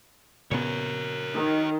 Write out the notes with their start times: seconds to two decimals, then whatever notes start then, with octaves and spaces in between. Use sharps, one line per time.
0.51 A#2 C#3 B3 A#4 C#5
1.34 D#3